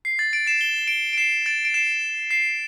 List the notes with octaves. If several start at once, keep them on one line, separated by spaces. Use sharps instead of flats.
C7
A6
A6 D7
C7 E7
G7
D7 G7
D7
C7 E7
A6 D7
D7
C7 E7
C7 E7